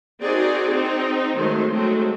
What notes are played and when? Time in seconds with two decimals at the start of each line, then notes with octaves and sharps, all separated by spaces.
0.22 C4 D#4 F#4 G#4 A#4 D5
0.72 C4 D#4
1.37 D#3 F#3 G#3 A3 C5
1.71 F#3 G#3 A3 C4